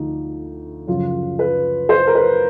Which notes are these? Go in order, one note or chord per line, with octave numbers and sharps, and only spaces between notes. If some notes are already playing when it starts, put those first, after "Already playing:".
Already playing: D2 D3 F3 D#4
F#2 C#3 F3 F4
B4
C5
A#4
B4